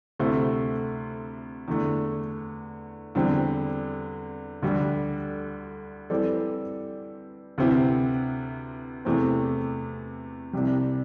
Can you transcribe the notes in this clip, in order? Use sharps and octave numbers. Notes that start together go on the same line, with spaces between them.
D2 C3 A3 E4 C5
E2 D3 A3
E2 D3 G3 C4
D2 D3 G3
E3 G3 C4 A4 D5
D2 C3 E3 C4 E4
E2 C3 E3 A3 C4
C2 C3 G3